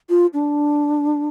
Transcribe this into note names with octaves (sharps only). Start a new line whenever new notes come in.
F4
D4